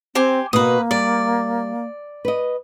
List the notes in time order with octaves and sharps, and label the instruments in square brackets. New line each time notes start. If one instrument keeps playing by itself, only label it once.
[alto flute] C4 [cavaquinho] G4 C5 G#5
[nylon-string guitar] B2 B3 F#4 [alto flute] A#3 [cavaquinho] B4 D#6
[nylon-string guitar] G3 [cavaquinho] D5
[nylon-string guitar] B4 D#5